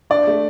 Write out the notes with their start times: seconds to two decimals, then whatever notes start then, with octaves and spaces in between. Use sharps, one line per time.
0.10 D4 D5
0.27 A3